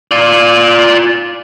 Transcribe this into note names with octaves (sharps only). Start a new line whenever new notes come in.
F4 D5